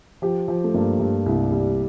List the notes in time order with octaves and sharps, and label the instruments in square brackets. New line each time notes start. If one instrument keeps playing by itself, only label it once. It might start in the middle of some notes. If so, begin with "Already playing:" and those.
[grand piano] F3 [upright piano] G4
[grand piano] F3
[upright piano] A3
[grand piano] G2 [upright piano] A#3
[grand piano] G2
C2
G3